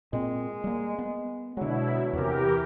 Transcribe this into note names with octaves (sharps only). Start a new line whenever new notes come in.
A#2 G#3 C4
G3 A#3
B3
B2 D3 F#3 G#3 E4
E2 C3 E3 G4 A#4